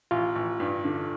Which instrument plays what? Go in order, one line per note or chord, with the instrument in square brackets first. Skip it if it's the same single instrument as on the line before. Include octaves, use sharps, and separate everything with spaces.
[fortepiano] A1 [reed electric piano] F4
[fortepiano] A1
G2
D3